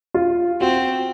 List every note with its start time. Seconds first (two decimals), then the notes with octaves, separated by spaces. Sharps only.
0.14 F4
0.60 C4 F#4